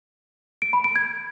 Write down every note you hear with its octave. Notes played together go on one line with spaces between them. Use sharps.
D7
B5
D7
G#6